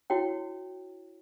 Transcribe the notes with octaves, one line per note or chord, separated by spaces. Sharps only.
E4 F#4 C#5 G5